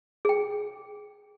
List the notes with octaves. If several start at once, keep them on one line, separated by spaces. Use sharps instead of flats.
G#4 G5